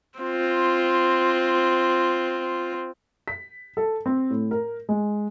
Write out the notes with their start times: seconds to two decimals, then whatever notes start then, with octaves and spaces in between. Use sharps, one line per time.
0.19 C4 F4
3.28 B6
3.77 A4
4.06 C4
4.30 A2
4.51 A#4
4.89 G#3